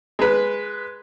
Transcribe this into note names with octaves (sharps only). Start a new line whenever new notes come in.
G#3 B4